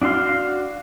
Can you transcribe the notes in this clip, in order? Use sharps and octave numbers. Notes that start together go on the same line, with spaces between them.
D4 F#4 F5 C6 F6